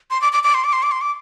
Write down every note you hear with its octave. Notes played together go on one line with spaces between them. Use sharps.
C6
D6
D6
D6
C6
D6
C6
D6
C6
D6